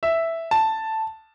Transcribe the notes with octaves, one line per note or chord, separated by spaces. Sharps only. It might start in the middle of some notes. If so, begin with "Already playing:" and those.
E5
A5